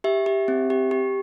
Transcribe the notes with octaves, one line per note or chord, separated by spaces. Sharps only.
G4 E5
G4
C4
G4
G4